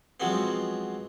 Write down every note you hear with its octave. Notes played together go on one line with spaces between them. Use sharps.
F3 F#3 G#3 B3 C4